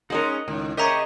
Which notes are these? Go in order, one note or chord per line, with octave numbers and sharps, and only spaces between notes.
G#3 C#4 D#4 A#4 D#5 F#5
C#2 A2 D#3
C#3 G4 A#4 C5 C#5 D#5 E5 A#5